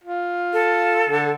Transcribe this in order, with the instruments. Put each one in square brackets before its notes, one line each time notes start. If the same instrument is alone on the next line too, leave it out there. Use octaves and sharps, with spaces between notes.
[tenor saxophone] F4
[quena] A4
[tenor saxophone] D3